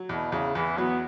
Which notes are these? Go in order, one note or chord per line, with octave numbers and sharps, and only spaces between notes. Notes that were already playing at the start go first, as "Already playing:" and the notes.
Already playing: F#3
E2 B2
E2 C#3
E2 E3
F#3 B3